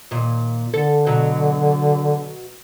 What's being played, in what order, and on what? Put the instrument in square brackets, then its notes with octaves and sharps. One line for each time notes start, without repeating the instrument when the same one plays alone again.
[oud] D#2 A#2
[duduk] D3 [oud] A4
[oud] B2 F#3